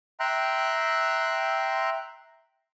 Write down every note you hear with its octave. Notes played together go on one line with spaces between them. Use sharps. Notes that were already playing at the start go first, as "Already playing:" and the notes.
E5 G5 A#5 C6 F#6